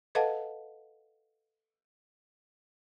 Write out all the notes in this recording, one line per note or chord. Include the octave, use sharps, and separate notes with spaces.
A4 B4 D#5 F5 F#5 A5